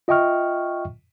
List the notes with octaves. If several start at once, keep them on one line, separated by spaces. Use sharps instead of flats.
F4 D#5 E5 G5 C#6 F6